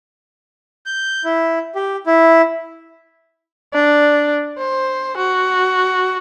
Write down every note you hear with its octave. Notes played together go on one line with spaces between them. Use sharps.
G6
E4
G4
E4
D4
C5
F#4